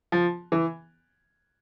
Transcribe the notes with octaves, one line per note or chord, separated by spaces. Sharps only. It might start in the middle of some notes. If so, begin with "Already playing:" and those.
F3
E3